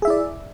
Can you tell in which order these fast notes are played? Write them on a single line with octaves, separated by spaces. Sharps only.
G#4 E5 E4 D5